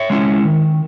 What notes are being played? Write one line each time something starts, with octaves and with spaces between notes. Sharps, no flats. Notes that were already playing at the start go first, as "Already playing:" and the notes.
Already playing: C#5 E5
G#3 C#4 E4
D#3